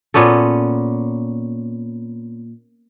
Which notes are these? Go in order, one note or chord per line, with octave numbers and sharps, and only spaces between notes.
A#2 B3 C#4 A4